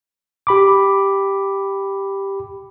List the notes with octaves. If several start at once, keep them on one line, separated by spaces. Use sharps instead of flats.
G4 B5 D6